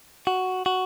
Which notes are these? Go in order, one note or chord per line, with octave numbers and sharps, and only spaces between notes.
F#4
F#4